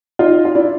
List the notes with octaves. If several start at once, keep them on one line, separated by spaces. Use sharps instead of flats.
D#4 F4
F4
D4 E4